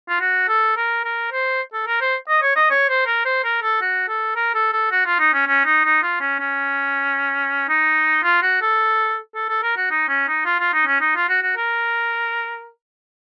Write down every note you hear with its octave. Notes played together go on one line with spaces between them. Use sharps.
F4
F#4
A4
A#4
A#4
C5
A4
A#4
C5
D#5
C#5
D#5
C#5
C5
A#4
C5
A#4
A4
F#4
A4
A#4
A4
A4
F#4
F4
D#4
C#4
C#4
D#4
D#4
F4
C#4
C#4
D#4
F4
F#4
A4
A4
A4
A#4
F#4
D#4
C#4
D#4
F4
F4
D#4
C#4
D#4
F4
F#4
F#4
A#4